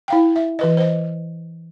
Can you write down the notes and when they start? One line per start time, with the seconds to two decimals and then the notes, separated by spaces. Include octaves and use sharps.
0.08 E4 F5 G5
0.36 E5
0.59 E3 B4 D#5
0.77 C5 D#5